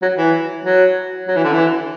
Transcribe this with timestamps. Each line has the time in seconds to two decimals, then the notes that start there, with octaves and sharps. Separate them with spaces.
0.02 F#3
0.18 E3
0.65 F#3
1.28 F#3
1.37 E3
1.44 D3
1.53 E3